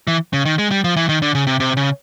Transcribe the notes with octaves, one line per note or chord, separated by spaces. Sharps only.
E3
C#3
D#3
G#3
G3
F3
E3
D#3
D3
C#3
C3
C3
C#3